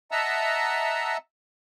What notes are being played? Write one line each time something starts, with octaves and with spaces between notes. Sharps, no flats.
D#5 E5 F#5 A5 A#5 E6